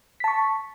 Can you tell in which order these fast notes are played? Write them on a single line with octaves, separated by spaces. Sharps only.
B6 A5 C#6